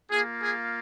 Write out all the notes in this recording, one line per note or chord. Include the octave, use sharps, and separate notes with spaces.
A#3 F4 G#4
G#4